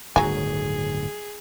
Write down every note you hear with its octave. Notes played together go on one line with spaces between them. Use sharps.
D1 G1 D#3 F#3 G#4 G#5